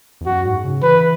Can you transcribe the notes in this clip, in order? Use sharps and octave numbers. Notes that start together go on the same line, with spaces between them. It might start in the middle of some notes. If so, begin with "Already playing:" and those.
E2
F#2 F#4
G#2
C#3
E3 B4